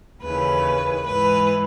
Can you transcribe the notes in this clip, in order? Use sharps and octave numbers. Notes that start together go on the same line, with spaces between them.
D#2 C#3 E3 B4
G#2 E3 B4